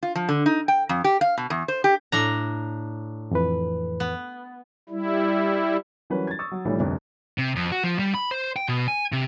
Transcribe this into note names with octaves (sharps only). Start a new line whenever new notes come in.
F4
F3
D3
D#4
G5
F2
G4
F5
B2
E2
C5
G4
A2 D4 A#5
F2 E3 B4
B3
G3 E4
E3 F#3 G3 C#4 A#4 B4
G#6 A6
C#6 D#6 E6 A6
F#3
B1 A2 E3 F3 G3 A3
G1 C2 F2
C3
F2
F#4
F3
G3
B5
C5
G5
B2
G#5
C3